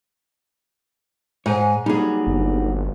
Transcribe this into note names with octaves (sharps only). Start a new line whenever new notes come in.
G#2 C#5 G#5
F#3 G3 A#3 D#4 G#4
G1